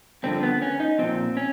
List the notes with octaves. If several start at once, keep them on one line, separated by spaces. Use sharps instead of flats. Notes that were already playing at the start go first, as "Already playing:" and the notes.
G2 D3 F3 C4
B3
C#4
D#4
A#2 F3 C4
C#4